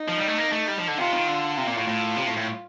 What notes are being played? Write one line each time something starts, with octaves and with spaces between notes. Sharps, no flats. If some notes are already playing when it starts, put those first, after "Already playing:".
Already playing: D#4
F3
G3
A3
A#3
A3
G3
F3
D3
C3 F4
D#3
D3
C3 F4
A#2
A2
A2
C3
A2
A2